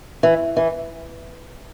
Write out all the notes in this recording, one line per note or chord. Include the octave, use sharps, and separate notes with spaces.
E3
E3